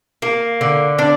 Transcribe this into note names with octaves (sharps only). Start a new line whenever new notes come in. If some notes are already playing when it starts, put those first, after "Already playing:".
A#3
D3
D4